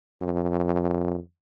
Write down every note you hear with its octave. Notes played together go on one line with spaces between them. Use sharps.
F2